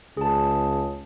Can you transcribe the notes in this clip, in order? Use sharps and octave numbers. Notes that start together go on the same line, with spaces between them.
C#2 G#4 A5